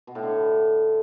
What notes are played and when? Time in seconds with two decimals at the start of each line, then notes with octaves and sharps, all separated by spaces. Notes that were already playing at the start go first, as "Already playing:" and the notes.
0.07 B2
0.15 A2
0.23 D3